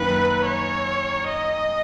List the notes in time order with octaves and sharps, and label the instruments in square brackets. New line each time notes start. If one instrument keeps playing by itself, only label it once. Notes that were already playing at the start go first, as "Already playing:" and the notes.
Already playing: [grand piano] F#2 D#3 A#3 D#4 [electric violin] B4
[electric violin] C#5
D#5